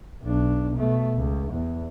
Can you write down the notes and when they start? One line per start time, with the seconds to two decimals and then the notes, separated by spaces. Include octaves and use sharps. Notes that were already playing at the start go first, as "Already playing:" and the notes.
0.23 B1 D4
0.76 B2 A3
1.17 C#2
1.52 E2